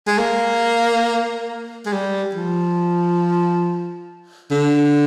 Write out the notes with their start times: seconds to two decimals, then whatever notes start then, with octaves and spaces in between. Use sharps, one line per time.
0.07 G#3
0.18 A#3
1.86 G#3
1.93 G3
2.35 F3
4.51 D3